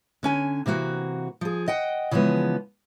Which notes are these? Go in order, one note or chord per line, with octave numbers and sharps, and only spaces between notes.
D3 C#4 G#5
C3 E3 A#3 F#4
F3 G#4
D#5 F#5 G5
C#3 E3 F3 G#3 B3